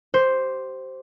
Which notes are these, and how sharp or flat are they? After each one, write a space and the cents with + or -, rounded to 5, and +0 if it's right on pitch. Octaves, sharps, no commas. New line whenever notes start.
G4 -30 C5 +0